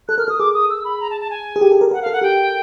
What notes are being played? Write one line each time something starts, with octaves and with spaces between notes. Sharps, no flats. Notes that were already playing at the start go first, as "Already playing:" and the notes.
A4 F#6
A#4 F6
A4 D#6
G#4 D6
D#6
E6
B5
A#5
A5
A5
G#5
G#4
G4
A4
A#4
A#4 F#5
F5
A4
F#5
G4 G5